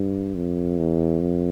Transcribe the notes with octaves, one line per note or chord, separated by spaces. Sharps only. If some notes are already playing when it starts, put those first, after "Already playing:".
Already playing: G2
F2
E2
F2